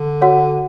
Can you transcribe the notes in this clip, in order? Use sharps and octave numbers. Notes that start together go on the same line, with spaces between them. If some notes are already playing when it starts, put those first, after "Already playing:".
Already playing: D3
F#4 C#5 F#5